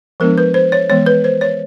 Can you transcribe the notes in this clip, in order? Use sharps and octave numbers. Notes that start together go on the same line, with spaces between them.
F3 G#3 B3 D4 A#4
B4
C5
C#5
E3 G#3 B3 C#5
B4
C5
C#5